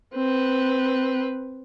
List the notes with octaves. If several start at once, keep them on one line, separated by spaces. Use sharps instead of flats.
C4 B4